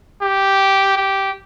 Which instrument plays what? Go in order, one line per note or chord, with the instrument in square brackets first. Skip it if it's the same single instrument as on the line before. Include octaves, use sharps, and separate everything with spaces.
[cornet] G4
G4